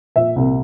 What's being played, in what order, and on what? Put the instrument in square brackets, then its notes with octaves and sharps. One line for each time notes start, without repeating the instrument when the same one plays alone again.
[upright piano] A#2 E5
C2